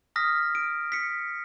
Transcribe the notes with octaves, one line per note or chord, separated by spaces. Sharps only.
D#6 F6 A#6 B6
D7
B6 C#7